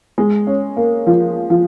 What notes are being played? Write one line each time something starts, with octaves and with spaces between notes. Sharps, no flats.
G#3
C#4
A#3
F3
F3